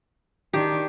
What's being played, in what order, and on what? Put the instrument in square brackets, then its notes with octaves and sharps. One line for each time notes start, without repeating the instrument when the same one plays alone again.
[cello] D#3 D4 [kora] G4